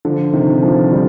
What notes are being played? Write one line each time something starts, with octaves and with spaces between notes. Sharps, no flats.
D3 F3
C3 D#3
D3 F3
D#3 G3